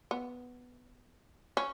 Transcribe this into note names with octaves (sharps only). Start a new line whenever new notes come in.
B3
C#4